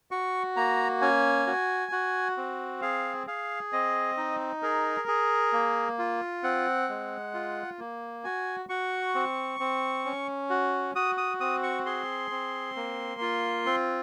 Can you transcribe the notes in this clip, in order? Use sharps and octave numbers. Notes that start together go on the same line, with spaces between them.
F#4 C#6
A#3 A#5
C#4 G#5
F#4
F#4
C4
G#4 F5
G#4 F5
C4 D#5
D#4
G#4 A#4
G#4
A#3
F4
C4 F#5
G#3
F4
A#3
F#4 G#5
F#4 C#6
C4
C4
C#4
F#4
F#4 D#6
D#6
C4 D#6
C#6
G#4 C6
C4
A#3
F4
C4